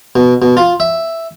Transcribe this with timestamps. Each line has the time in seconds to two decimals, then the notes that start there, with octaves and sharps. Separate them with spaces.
0.16 B2
0.42 B2
0.57 F4
0.80 E5